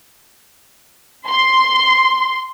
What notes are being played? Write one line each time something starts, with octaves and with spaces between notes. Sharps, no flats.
C6